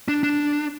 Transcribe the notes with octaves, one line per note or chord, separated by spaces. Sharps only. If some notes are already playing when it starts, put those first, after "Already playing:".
D4
D4